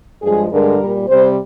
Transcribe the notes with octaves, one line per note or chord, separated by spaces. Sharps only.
G2 F3 G#3 G#4
G2 D3 G#3 A#4
A#2 G3
C3 G3 C5